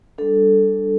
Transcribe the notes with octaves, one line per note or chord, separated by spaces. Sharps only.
G3 D4 A4